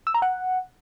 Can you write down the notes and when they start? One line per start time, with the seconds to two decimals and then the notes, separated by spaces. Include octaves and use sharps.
0.07 E6
0.14 A#5
0.22 F#5